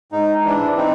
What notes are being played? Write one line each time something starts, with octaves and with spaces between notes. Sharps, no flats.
G#2 D#4
E3 D4
C4 D#4